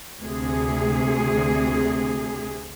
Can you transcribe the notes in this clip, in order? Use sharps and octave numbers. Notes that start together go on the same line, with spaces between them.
D2 C3 G#4